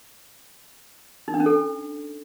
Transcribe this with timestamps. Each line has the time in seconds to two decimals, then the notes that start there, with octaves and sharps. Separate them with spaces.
1.28 D#4
1.34 D4
1.40 C#4
1.46 A4